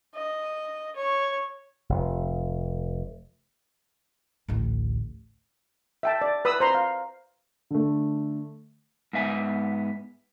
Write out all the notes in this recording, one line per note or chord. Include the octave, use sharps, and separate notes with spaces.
D#5
C#5
F1
A1 D2
E5 G5 A5
D5
B4 B5 D#6 E6
C5 A#5 C6
F5
D3 A3
G#2 B3 E5 G#5